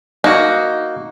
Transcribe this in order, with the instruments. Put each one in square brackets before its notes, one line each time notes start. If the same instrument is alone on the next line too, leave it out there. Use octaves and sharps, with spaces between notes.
[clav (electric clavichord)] A#3 F#4 [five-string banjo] D#4